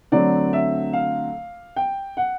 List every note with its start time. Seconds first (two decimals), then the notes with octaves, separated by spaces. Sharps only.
0.12 D3 F#3 A3 C4 D5
0.53 E5
0.93 F5
1.76 G5
2.17 F#5